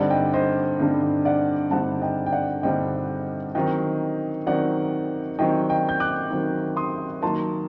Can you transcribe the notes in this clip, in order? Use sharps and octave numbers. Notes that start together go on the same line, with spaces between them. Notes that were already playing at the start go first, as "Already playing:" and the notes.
Already playing: G2 D3 G3 C4 D#4 D5 F#5
D#5 G5
C5 D#5
G2 D3 G3 C4 D#4
D5 F#5
G2 D3 G3 C4 D#4 F#5 A5
D#5 G5
G5
D5 F#5
G2 D3 G3 C4 D#4 D#5 G5
D#3 F#3 C4 D#4 D#5 G5
D#3 F#3 C4 D#4 D5 F#5
D#3 F#3 C4 D#4 D#5 G5
D#5 G5
G6
D6 F#6
D#3 F#3 C4 D#4
C6 D#6
D#3 F#3 A#3 D#4 A5 C6